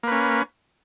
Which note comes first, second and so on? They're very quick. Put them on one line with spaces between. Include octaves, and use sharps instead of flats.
A#3 B4 C#4